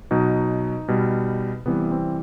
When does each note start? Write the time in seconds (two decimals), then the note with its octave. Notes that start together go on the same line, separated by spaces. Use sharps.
0.11 B2 F#3 D#4
0.88 B2 G3
1.66 C3 E3 G3 B3
1.91 C4